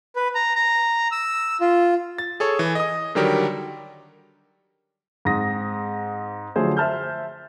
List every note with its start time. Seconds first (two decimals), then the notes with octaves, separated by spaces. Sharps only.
0.16 B4
0.35 A#5
0.55 A#5
1.12 E6
1.61 F4
2.18 A6
2.40 G#4 A4 C#5
2.59 E3
2.75 D#5 D#6
3.15 D3 D#3 F#3 G3 G4 A#4
5.25 G#2 G#3 C4 D#6 A#6
6.56 D3 F3 F#3 A3 G#4 C5
6.77 C5 E5 A5 F6 G6